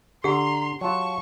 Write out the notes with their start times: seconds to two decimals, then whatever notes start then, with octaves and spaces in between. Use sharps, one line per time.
0.24 D3 G4 F#5 A#5 C6
0.81 F#3 F4 A5 C#6